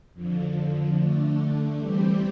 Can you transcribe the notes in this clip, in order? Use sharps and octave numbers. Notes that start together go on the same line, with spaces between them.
F2 D3 F3
D3 A3 D4
E3 G3 C4 G4